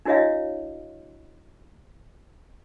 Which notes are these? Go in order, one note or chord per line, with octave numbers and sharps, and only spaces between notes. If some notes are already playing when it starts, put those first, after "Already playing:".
D4 E4 F#4 C#5 D#5 F5